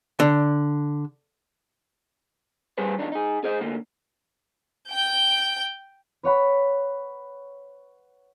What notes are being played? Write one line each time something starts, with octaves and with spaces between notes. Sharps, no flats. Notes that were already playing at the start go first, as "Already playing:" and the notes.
D3
G3 G4 G#4 B4 C5
E2 D4 D#4
D#4 G#4
G#4 C5 D#5
D2 D3 A#3
G5 G6
B4 C#5 F#5 B5